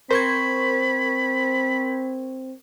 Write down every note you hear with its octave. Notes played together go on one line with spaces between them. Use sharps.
C4 A#4 C5 B5 C#6 G#6